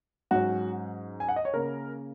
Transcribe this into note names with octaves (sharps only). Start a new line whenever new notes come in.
G#2 F#3 C#4 F#4
G#5
F#5
D#5
C#5
C#3 A#3 C#4 A#4